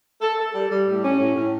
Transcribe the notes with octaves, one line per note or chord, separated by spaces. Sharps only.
A4
A4
G3
G3
A2
C#4
A2
A2